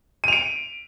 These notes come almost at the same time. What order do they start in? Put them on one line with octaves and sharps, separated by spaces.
D#7 F7 D7